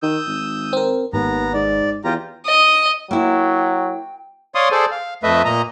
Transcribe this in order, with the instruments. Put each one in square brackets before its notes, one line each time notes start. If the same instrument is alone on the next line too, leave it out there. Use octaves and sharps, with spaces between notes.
[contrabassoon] D#3 [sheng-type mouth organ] D#6 E6 G6
[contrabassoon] G#1
[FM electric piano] C4 A#4
[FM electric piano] G#1 [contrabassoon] D#2 [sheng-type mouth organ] B3 A#5
[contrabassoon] G#2 [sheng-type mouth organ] D5
[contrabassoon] E2 [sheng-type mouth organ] F4 G4 A#5
[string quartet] D#5
[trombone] F#3 [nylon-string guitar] A#3 E4 [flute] G5
[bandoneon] C#5 D5 F5 C6 D#6
G#4 A4 C5 D5
F5
F2 A3 B4 D#5 E5
A#2 D#5 A#5